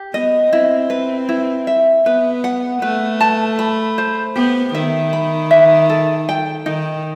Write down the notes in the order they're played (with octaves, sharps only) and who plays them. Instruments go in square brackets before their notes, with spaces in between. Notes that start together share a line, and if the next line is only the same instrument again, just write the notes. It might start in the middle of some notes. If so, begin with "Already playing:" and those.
Already playing: [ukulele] G4
[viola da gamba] B3 [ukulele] D#5
[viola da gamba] C4 [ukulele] E4
[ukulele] B4
E4
E5
[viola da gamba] B3 [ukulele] B4
[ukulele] F#5
[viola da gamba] A3 [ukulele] B4
[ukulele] A5
B5
C5
[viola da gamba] B3 [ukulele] G4
[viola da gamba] D#3 [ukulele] E5
[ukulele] B5
E5
A4
G5
[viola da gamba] D#3 [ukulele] D#4